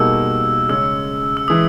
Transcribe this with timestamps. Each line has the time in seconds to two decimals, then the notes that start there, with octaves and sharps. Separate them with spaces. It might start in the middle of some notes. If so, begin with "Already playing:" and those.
Already playing: B2 G3 A#3 D#4 G#4 E6
0.69 C#3 G#3 C#4 E6
1.37 E6
1.48 E3 G#3 D#6